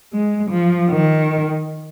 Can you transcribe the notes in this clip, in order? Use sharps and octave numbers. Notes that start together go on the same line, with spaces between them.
G#3
F3
D#3